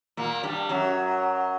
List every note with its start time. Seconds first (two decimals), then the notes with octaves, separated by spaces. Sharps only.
0.17 A#2 A#3
0.43 G2 G3
0.69 F#2 F#3